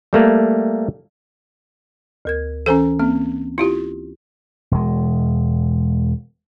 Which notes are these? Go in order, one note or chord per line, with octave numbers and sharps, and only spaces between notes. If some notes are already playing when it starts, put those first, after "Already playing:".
G3 A3 A#3
D2 A#4 G#6
E3 C#4 A4 C5 G#5
A#3 C4
E4 F4 G4
E1 G#3